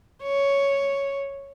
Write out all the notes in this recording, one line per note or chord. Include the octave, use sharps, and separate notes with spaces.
C#5